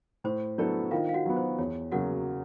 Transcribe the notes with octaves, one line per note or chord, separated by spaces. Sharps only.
A2 C5
F#3 B3 D4 E4 A4 D5
D#3 F4 F5
F5
F#4 F#5
F#3 B3
C5
E2 C#5
C#3 F#3 A#3 F#4 F#5